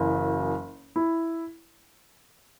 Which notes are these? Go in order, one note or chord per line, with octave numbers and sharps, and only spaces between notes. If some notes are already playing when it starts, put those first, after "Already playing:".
Already playing: F#1 F#2 E3
E4